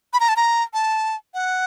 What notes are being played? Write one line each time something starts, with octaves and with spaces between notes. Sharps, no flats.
B5
A#5
A5
A#5
A5
F#5